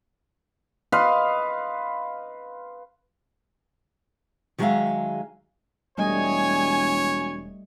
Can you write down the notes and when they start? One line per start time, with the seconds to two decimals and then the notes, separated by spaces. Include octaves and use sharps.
0.92 B4 D#5 F5 C6
4.58 D#3 F#3 G#3 G#4 E5 F5
5.98 E1 G3 A3 C#5 D#5 G#5